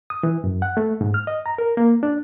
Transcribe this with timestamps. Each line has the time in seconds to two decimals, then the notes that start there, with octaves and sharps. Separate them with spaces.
0.10 D#6
0.23 E3
0.44 F#2
0.62 F#5
0.77 A3
1.01 G#2
1.14 F6
1.27 D#5
1.46 A#5
1.58 A#4
1.77 A#3
2.03 D4